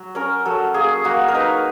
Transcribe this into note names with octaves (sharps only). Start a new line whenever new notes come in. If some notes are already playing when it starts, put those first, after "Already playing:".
Already playing: F#3
C#4 A#4
F#3 A4
A#3 G#4
A#3 F#4
A#4
D#4 B4